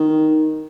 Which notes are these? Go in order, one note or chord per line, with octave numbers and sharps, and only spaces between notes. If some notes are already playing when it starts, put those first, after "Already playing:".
Already playing: D#3